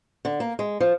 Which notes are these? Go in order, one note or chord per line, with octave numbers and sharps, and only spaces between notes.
D3
A#3
G#3
F3